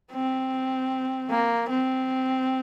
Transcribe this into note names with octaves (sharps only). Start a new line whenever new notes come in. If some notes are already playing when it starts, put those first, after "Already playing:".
C4
A#3
C4